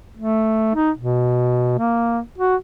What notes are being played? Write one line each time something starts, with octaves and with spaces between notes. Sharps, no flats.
A3
D#4
B2
A#3
F#4